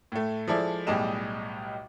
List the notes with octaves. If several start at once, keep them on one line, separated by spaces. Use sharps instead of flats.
A2 A3
F3 G#3 E4 A4 D5
B1 A2 G3 G#4 D#5 E7